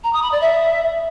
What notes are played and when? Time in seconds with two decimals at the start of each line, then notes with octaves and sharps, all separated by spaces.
0.04 A#5
0.13 D#6
0.22 B5
0.32 D5
0.41 E5